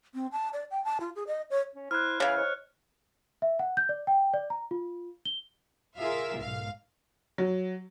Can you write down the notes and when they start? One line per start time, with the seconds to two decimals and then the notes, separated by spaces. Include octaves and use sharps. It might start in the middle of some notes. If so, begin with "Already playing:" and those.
0.14 C4
0.32 A5
0.53 D5
0.71 G5
0.84 A5
1.00 F4
1.16 G#4
1.27 D#5
1.50 C#5
1.75 C#4
1.91 E4 C5 B5 F6 F#6 G#6
2.20 C#3 E3 F5
2.37 C5 C#5 D#5
3.42 E5
3.59 F#5
3.77 G6
3.89 D5
4.07 G5
4.34 D5
4.50 A#5
4.71 F4
5.25 G7
5.97 F4 G#4 A#4 E5 F5
6.39 B1 G#2 F5
7.38 F#3